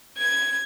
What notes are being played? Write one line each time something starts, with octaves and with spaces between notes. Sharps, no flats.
G#6